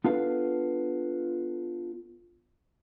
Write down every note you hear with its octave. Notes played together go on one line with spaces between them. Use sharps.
B3 D4 F4 A4 B4 F5